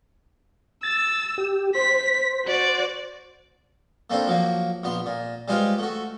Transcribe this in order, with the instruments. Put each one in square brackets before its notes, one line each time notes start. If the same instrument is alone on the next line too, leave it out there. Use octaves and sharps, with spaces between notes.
[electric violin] E6 [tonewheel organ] A6
[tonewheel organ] G4
[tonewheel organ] C5 [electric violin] B6
[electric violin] F#4 D5
[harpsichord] A3 A#3 C4 D4 C5
F3 F#3 A#3
A#1 B3 C6
A#2
G3 G#3 F4 B4 C5 F5
A3 F#4